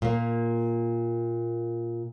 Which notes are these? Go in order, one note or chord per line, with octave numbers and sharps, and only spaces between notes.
A#2 A#3